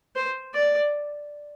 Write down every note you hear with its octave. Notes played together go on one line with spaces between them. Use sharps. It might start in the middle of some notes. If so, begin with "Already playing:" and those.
C5
D5